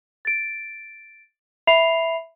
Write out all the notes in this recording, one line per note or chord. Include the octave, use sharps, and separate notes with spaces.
A6 D7
E5 B5 C7 F7